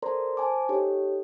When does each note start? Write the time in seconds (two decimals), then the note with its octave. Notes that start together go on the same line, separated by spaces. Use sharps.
0.02 A4 A#4 C5 D5 A#5 C6
0.37 C5 G#5 A5 D6
0.69 D#4 G4 A4 C#5